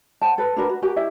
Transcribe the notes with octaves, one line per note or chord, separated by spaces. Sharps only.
C5 F#5 G5 A5
A4 B4
D4 F#4 A#4 B4
F#4
F#4 G4 A#4 G#5
E4 G4 E5